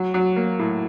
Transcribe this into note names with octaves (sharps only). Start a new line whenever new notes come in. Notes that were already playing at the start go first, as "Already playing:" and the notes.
Already playing: F#3
F#3
A#3
A2